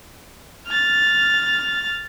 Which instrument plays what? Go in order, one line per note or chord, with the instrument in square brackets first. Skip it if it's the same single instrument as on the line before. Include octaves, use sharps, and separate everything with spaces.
[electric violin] F6 A6